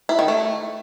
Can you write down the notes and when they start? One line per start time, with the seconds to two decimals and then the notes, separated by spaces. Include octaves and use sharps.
0.09 E4
0.19 D#3
0.28 A3